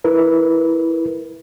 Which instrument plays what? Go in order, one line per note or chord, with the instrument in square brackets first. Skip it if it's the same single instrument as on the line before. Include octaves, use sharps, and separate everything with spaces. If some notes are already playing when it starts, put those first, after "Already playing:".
[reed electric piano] E4 A#4 B4